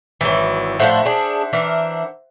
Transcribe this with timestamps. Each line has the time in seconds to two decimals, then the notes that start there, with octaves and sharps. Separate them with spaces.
0.21 G#1 E3 F#3
0.80 A2 F3 D4 C5 E5 F#5
1.05 D4 G#4
1.53 E3 D4 A#4